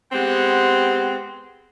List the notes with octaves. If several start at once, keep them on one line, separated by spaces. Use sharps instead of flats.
G#3 B3 C4 G4 F#5